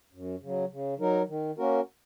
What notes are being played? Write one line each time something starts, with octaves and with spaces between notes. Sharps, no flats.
F#2
C#3 F#3
C#3
F#3 D#4 A#4
D#3
A#3 C#4 F#4 A#4